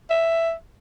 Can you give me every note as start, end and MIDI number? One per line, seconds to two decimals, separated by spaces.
0.10 0.53 76